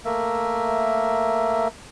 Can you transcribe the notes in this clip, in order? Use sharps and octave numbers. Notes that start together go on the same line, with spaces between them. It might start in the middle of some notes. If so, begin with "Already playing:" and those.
A3 A#3 A#4 E5